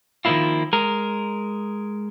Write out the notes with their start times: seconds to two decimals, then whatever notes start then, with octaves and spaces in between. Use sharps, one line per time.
0.25 D#3 F3 F#3 A#3 E4 F4
0.73 G#3 A#4